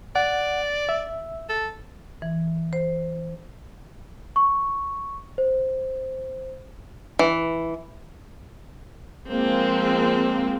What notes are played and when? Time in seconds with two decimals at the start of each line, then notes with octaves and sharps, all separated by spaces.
0.16 D5 F#5
0.89 E5
1.49 A4
2.22 E3
2.73 C5
4.36 C#6
5.38 C5
7.19 E3
9.30 F3 G#3 A#3 C4